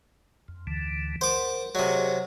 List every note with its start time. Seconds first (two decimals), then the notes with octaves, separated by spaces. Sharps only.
0.48 F2
0.67 D2 D3 E3
1.21 A#4 C5 F#5 D6
1.75 C3 F#3 G#4 D5 D#5